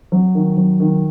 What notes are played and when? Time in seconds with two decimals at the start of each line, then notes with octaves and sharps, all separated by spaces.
0.12 F#3
0.35 D#3
0.57 F#3
0.80 D#3